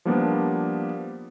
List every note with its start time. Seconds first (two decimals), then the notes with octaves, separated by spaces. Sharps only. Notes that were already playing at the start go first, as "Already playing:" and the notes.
0.05 F3 G3 A#3 B3 D4